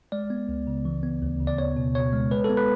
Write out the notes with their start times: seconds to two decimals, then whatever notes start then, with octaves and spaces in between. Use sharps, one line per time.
0.12 G#3 D5
0.30 B3
0.49 C#2
0.67 C#3
0.85 E3
1.03 B3
1.22 D2
1.40 C#3
1.47 D5
1.58 B3 C#5
1.77 B2
1.95 B2 C#5
2.13 G#3
2.31 G#3 B4
2.44 B3 A4
2.57 B4